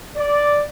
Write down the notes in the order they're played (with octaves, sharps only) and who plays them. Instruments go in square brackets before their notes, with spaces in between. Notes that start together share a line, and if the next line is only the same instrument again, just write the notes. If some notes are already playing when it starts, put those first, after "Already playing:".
[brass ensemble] D5